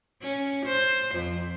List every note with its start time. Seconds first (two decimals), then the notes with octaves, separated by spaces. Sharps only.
0.22 C#4
0.65 C5
1.15 F2